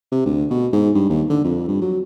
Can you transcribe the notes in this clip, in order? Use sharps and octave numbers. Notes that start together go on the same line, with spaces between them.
C3
D2
B2
G#2
G2
D#2
D3
F2
G2
F#3